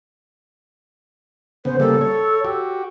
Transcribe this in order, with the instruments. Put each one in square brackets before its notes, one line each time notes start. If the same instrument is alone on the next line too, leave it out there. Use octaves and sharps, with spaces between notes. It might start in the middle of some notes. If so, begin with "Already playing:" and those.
[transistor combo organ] C#3 B3 [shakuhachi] C5
[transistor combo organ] C#3 G3 A#3 [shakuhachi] A4
[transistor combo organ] C#5
F#4 G4